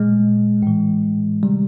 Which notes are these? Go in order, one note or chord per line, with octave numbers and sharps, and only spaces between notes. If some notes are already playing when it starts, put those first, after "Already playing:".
Already playing: A#2 G#3
A2 E3
C3 D#3 G3